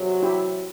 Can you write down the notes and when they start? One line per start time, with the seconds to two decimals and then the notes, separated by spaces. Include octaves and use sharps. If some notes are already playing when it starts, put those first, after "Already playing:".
Already playing: E2 C3 F#3
0.23 E4 G4